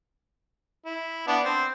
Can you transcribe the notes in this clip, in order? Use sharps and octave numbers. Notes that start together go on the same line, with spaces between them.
E4
B3 D4
C4